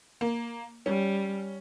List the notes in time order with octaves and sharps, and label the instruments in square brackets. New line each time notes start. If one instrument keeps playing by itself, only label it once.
[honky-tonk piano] A#3
[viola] G3 [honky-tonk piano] C#4